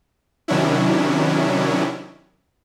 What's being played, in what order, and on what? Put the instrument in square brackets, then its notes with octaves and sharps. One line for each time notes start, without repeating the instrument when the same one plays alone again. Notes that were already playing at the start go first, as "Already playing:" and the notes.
[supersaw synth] C3 D#3 F#3 C#4 D4 E4